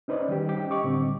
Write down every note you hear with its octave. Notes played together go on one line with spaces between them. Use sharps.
C#4 D#4 B4 C5 D5 D#5
D#3 G3 G4
C#4 G4
D#5 C#6 D6
A2 D3 G3 C4